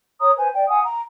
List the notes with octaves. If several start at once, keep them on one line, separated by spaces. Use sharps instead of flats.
C#5 A#5 D#6
B4 C5 G#5
D5 G5
F5 F#5 G#5 D#6
A#5